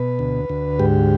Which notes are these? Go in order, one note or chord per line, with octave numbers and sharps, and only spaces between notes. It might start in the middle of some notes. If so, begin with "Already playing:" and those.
Already playing: B2 B4
D2
D2
G#2 G4